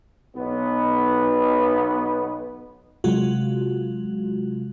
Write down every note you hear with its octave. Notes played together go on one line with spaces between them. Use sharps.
B1 B3
C3 F#3 G#3 F4 F#4